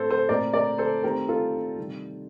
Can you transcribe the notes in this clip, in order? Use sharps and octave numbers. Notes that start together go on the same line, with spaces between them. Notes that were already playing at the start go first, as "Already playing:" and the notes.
Already playing: A2 A3 C4 A4 C5
A4 C5
A#2 A3 C4 A#4 D5
A#4 D5
A4 C5
D#3 A3 C4 G4 A#4
F4 A4
C3 D#3 G3